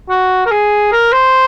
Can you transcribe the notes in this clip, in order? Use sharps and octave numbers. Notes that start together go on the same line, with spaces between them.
F#4
A#4
G#4
A#4
C5